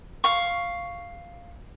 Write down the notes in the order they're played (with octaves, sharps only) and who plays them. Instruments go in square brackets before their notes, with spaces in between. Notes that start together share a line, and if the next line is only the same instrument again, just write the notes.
[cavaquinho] F5 C#6